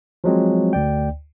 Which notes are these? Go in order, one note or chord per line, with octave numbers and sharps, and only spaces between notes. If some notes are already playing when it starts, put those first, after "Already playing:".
F3 F#3 G#3 C4
D2 D5 G5